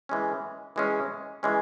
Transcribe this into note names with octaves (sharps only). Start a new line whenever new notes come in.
E3 G#3 C#4
E3 G#3 C#4
E3 G#3 C#4